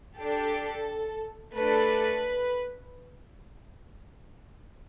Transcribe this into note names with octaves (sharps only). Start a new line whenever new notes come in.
D4 G4 A4
A3 D4 A4 B4